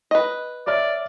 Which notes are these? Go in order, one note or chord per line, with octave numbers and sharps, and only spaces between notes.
B4 D#5
C#5 D5 E5 F6